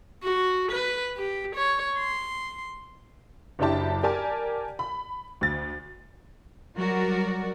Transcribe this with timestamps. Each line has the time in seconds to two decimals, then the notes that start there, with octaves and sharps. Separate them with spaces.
0.23 F#4
0.71 B4
1.16 G4
1.55 C#5
1.98 C6
3.59 F#1 F#2 D4 E4 G4 A5
4.03 G4 A#4 D5 G#5 A5
4.79 B5
5.41 D2 A6
6.75 F#3 G3 F#4 A#4 D5